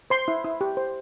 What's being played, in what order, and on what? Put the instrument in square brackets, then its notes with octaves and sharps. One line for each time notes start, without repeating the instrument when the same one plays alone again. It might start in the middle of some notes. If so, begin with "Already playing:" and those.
[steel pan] C5 C6
E4
E4
G4
C5